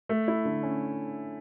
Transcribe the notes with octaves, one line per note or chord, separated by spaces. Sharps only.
A3
E4
D3
C#4